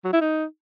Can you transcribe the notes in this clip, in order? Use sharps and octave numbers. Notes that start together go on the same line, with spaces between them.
F#3
E4
D#4